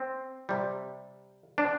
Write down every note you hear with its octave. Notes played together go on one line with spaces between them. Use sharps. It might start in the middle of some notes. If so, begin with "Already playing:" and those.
Already playing: C4
C3 G3
D4